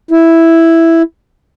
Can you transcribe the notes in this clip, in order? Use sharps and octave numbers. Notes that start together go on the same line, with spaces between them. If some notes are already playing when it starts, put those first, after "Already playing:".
E4